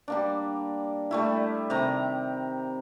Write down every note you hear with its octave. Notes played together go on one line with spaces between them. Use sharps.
G3 A#3 D4
G3 A3 E4
C3 D#3 A#5